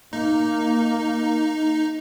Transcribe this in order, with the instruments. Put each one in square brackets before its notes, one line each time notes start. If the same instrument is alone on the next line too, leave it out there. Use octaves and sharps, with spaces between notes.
[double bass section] A#3 [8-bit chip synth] D#4